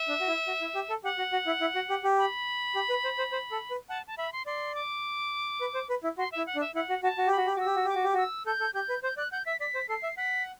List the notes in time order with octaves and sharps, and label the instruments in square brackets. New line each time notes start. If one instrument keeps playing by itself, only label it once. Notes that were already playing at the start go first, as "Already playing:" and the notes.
Already playing: [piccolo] E5
[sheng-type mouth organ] D4
F#4
E4
F#4
E4
G4
A4
[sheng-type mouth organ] G4 [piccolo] F#5
[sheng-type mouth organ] F#4
F#4
E4
E4
F#4
G4
G4
[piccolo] B5
[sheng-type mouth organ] G4
B4
C5
C5
C5
A4
B4
[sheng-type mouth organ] F#5 [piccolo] A5
[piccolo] A5
[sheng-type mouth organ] E5 [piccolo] B5
[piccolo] C6
[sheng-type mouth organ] D5 [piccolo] C6
[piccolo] D6
[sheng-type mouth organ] B4
C5
B4
E4
[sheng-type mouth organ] F#4 [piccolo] C6
[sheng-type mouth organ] E4 [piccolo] E5
[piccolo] F#5
[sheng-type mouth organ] D4
[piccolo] E5
[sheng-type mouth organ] E4 [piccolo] F#5
[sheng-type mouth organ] F#4
[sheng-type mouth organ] F#4 [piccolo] A5
[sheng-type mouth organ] F#4
G4
[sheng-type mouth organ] F#4 [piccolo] B5
[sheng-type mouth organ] G4
[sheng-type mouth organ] F#4 [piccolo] D6 E6
[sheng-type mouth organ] G4
F#4
[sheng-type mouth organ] G4 [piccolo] D6
[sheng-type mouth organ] F#4
G4
[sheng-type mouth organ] F#4 [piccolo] E6
[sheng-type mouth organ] A4 [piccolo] G6
[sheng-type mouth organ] A4
[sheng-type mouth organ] G4 [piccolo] G6
[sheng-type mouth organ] B4
[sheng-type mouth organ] C5 [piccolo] G6
[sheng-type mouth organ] D5 [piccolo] F#6
[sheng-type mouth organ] F#5 [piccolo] G6
[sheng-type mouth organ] E5 [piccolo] B6
[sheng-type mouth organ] D5 [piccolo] B6
[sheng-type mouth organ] C5
[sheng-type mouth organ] A4 [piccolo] C7
[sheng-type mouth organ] E5
[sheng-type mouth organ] F#5 [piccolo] B6